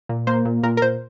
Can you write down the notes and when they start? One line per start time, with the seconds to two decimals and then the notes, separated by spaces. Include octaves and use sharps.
0.09 A#2
0.27 A#3 C5
0.45 A#2
0.63 A#2 A#4
0.77 A#4
0.82 A#2 C5